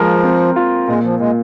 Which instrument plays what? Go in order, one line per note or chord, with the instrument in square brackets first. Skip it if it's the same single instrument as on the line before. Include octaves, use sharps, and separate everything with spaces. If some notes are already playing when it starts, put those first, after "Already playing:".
Already playing: [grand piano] D#2 G#3 A#4 [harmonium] F3
[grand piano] C4
F4
[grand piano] A#2 [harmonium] G#3
[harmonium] F3
[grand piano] A#2 [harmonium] G#3